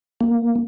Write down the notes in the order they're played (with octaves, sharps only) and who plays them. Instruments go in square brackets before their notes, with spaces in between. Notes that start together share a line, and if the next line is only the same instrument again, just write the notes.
[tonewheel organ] A#3